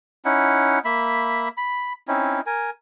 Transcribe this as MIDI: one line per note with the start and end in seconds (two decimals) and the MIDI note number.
0.25 0.79 61
0.25 0.79 63
0.25 0.79 64
0.25 0.79 78
0.85 1.49 58
0.85 1.49 76
0.85 1.49 83
1.57 1.93 83
2.08 2.41 60
2.08 2.41 61
2.08 2.41 63
2.08 2.41 64
2.46 2.70 70
2.46 2.70 80